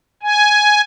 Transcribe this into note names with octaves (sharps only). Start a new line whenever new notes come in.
G#5